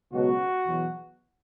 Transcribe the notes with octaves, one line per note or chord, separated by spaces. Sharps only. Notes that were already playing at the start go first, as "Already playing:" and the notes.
C#2 B2 F#3 F#4
E2 B2 F#3